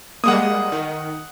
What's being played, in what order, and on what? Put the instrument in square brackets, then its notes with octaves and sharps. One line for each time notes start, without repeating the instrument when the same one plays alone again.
[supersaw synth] G3 G#3 A#3 [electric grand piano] F#5 D#6
[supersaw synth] D#3